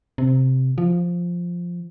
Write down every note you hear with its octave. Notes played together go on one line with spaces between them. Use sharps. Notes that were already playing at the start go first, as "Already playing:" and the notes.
C3
F3